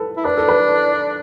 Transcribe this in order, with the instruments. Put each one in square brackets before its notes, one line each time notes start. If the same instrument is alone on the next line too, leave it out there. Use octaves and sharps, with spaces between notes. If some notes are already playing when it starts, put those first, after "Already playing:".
Already playing: [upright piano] A4 B4
[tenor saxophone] E4
[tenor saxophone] D4 [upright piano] B4
[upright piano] A4
B4